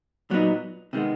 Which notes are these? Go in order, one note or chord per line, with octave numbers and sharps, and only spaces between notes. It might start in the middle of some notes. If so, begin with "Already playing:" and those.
A#2 F#3 B3 D#4
C3 D#3 G#3 B3